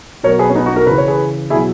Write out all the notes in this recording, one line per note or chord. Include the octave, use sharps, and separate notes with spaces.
B2 F#3 A#4 C#5
G#4 B4
C#4
B3 D#4
D#4 F#4
F#4 A#4
C#3 E3 B4
C#5
G#4 B4
B2 F#3 E4 G#4